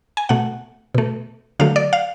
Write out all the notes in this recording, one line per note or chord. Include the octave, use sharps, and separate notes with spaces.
G#5
B2 A3 F#5
B2 A3
D3 F#3 A3 F5
D5
F5